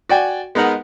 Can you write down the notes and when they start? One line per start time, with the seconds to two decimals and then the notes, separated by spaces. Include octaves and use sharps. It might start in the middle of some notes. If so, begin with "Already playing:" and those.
0.09 F#4 D5 G5 G#5
0.55 G#3 B3 D#4 A#4 F#5